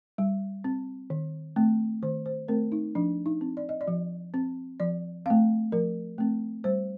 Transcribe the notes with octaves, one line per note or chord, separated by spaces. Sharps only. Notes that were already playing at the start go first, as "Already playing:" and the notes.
G3
C4
D#3
A3 C4
D#3 C5
C5
A3 C4 A#4
D#4
F3 D4
D#4
C4
D5
D#5
D5
F3
C4
F3 D5
A3 C4 F5
F3 A#4
A3 C4
G3 C5